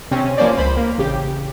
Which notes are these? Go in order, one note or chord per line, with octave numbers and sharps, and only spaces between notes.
C3 C4 C#4
F3 A#3 C#4 C5 D5
C#2 C5 B5
A#3
A1 C#3 G4